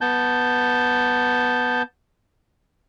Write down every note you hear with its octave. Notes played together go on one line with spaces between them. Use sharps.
B3 A5 G6